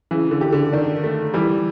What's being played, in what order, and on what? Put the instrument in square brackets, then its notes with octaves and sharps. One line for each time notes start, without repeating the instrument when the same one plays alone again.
[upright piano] C#3 [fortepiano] E3
[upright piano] D3
[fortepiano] G4
[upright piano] D3
[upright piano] D#3 [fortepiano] D4
[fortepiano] A3
[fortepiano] E3 [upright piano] G3